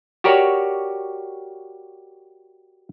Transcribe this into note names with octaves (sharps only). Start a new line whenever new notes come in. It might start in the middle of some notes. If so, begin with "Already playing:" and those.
F#4 G4 A#4 C#5 D5